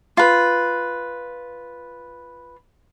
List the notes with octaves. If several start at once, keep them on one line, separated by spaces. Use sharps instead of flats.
F4 B4